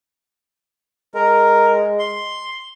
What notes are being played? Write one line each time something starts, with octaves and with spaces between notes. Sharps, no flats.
G#3 A#4
C6